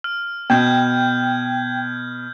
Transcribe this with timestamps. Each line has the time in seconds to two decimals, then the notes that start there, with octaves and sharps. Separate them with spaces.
0.04 F6
0.50 B2 G5 G6 G#6